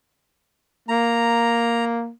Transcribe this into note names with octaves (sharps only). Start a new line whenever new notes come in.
A#3 A#5